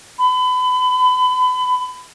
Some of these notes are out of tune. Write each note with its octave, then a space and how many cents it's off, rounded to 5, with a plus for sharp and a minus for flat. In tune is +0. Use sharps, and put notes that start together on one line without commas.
B5 +30